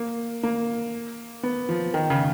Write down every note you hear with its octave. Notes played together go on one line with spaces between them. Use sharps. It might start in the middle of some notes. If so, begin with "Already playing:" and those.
Already playing: A#3
A#3
B3
F3
D#3
C#3